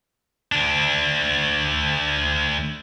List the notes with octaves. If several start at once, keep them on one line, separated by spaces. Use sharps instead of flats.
D2 D4